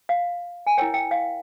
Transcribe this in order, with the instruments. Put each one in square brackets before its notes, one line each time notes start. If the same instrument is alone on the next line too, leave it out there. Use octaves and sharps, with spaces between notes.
[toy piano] F5
G#5
E4 A#4 C#5 G5
G5
F5